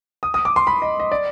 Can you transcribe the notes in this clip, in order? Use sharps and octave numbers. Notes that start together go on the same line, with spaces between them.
D#6
D#6
D6
C6
B5
D#5
D#5
D5